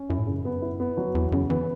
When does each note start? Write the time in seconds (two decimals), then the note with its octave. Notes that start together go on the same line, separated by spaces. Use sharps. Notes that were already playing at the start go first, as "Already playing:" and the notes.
Already playing: C#4
0.09 F#2 E4
0.18 A2
0.26 F#2 C#3
0.45 B3
0.62 E4
0.80 B3
0.97 F#3
1.15 E2 E3
1.32 F#2 C#3
1.50 E3 B3